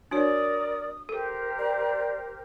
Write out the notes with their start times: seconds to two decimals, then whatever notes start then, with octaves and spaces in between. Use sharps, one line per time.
0.11 D4 F#4 A#4 C#5 D5 D#6
1.09 G4 A4 A#4 C5
1.58 D5